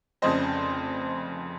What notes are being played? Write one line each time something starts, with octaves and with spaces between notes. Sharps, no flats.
F1 F2 C#3 C5 D#5